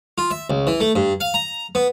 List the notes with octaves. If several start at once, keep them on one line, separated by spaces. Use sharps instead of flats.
F4
E5
C#2
E3
A3
G2
F5
A#5
B3